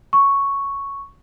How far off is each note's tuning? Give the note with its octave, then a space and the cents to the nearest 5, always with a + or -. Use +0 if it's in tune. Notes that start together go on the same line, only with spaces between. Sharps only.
C#6 +0